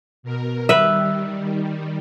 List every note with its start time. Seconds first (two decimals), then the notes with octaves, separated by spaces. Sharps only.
0.23 B2 A#4
0.69 D#3 G3 B4 E5